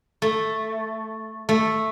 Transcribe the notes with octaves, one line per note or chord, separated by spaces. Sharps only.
A3
A3